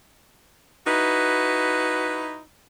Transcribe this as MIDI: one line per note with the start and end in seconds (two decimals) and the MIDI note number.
0.87 2.38 63
0.87 2.38 64
0.87 2.38 66
0.87 2.38 71